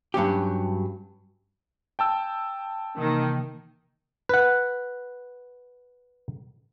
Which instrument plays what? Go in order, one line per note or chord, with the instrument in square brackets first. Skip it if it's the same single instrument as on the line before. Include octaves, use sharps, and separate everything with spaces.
[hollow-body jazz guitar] G2 F#3 C#4 G4
[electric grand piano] G5 A5 E6
[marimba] C3 E3 A#3 [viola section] D#3
[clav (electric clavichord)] B4 F#5